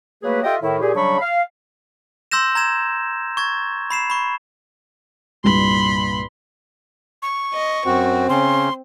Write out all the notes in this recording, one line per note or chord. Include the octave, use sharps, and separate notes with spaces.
F#3 A3 A#3 G#4 B4
F4 G4 A4 D#5 E5 G5
A2 D#3 E4
A#2 G4 G#4
C#3 F#3 G3 D4 B5 C#6
F5
C6 E6 G6 A#6 E7
A#5 G#6 E7
C#6 G#6 A6
B5 C7 E7
B5 C#6
C2 G2 A#2 B5 C6
C#6
D#5
F#2 C4 F#4
C#3 C#4 C6